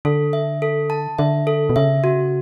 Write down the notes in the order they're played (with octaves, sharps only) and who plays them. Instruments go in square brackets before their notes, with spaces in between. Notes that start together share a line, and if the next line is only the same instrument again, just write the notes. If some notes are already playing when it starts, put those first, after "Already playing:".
[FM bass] D3 [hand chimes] A4
[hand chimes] E5
A4
A5
[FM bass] D3 [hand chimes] E5
[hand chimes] A4
[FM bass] B2
[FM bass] C#3 [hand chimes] E5
[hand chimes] F#4